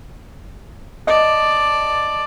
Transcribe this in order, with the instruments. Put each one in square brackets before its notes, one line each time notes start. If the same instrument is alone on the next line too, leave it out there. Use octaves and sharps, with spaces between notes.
[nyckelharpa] D5 A5 [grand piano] D#5